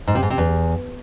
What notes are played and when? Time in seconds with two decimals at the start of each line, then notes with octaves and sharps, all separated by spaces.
0.07 G#2
0.15 C3
0.23 G#2
0.30 C3
0.38 E2